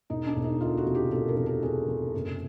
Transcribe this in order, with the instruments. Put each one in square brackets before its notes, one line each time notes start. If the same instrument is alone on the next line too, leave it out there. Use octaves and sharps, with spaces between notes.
[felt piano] E1 D#4
D4
E1
D#4
D2 F4
F#4
C3
G4
E1 A4
A#4
C3
A4
C3 G#4
C3
F#1